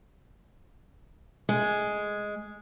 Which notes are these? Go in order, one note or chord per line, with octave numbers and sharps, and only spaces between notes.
G#3